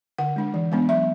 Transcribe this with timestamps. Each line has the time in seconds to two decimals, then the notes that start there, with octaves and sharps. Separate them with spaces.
0.18 D3 F#5
0.36 G#3 D4
0.54 E3
0.72 G#3 B3 D4
0.89 F#3 E5